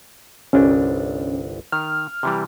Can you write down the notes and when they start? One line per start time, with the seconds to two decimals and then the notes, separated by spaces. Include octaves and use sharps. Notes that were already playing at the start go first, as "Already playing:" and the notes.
0.53 G1 C2 C#4 D4
1.72 D#3 F6
2.23 C3 E3 G3